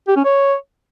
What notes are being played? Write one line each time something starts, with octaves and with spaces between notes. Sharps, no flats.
G4
C#4
C#5